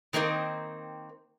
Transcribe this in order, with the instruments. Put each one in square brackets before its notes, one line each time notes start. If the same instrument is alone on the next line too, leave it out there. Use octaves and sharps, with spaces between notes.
[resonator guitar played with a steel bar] D#3 A#3 C4 D#4 A#4